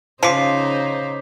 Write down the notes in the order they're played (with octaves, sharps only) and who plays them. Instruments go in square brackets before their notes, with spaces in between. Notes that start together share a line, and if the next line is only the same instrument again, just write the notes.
[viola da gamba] C#3 D#4 C5 [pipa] F3 [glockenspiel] D6 B6 C7